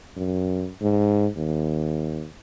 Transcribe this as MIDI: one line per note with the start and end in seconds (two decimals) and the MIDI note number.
0.16 0.67 42
0.82 1.27 44
1.37 2.26 39